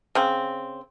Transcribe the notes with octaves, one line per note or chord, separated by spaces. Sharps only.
C#3 C4